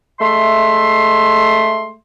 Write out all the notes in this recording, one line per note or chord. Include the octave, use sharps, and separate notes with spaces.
G#3 A3 E5 C6